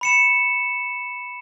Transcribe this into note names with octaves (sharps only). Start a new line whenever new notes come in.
B5 C#7 E7